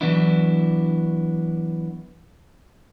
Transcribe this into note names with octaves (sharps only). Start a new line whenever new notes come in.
E3 F#3 B3 D4 E4